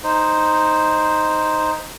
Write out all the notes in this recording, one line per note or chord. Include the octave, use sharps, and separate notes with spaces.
D#4 C5